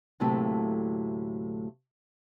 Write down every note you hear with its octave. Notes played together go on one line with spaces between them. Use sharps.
D2 A2 C3 F#3 A3 A#3